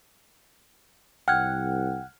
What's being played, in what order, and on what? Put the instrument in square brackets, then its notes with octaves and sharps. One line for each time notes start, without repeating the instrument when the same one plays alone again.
[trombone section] C2 [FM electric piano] F#5 [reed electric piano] G5 [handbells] F6 G#6